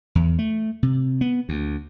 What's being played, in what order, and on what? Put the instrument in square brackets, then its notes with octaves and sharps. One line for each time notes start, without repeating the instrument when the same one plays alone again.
[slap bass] E2
A3
C3
B3
D2